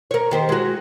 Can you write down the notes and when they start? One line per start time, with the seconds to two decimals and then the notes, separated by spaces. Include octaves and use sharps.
0.11 A#4 C#5
0.31 D#3 G4 C5
0.49 G#3 F#4